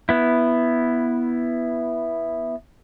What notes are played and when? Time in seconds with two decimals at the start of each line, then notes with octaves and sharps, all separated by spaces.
0.09 B3 E4